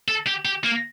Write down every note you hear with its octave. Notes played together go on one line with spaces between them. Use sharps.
A4
G4
G4
A#3